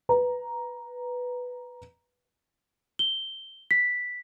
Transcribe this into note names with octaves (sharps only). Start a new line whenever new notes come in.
B4 A#5
G7
B6